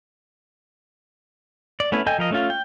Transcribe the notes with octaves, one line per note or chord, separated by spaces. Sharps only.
D5
A3 B3 C#4 E4 B4
A4 D#5 G5 G#5 G6
F3 A#4 D#5
A3 C#4 F4
G5